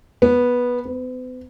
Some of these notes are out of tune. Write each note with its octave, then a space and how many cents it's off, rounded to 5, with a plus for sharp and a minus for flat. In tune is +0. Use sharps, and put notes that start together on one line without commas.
B3 -10
B3 +45